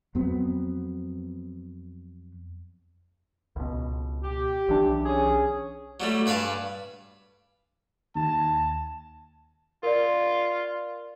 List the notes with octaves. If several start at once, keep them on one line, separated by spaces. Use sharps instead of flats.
F2 F#3 B3 C4
C#2 B2
G4
B1 E3 D4
C#4 G#4
F#3 G3 A3
G2 B4 D5 F5 G#5 A5
D#2 A5
F4 A#4 D5